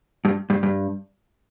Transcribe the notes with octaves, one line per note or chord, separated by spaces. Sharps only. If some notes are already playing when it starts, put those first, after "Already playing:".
G2
G2
G2